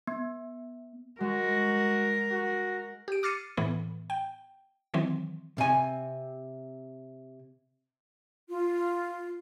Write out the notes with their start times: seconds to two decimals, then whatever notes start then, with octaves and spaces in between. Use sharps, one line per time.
0.07 B3
1.20 G#3 F#4 A#4
2.31 F#4
3.08 G4 D7
3.23 D6 F6 A6 C7 C#7 D#7
3.57 A2 E3 B3
4.10 G5
4.94 D#3 E3 F#3 C4
5.58 C3 G#5
8.49 F4